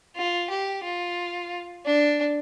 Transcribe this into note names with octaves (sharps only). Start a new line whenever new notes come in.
F4
G4
F4
D4